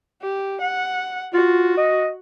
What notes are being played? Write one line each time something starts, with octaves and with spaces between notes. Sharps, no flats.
G4
F#5
F4 F#4
D#5